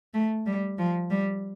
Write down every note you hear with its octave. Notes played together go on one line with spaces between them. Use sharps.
A3
G3
F3
G3